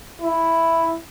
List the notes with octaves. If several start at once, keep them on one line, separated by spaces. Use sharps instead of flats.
E4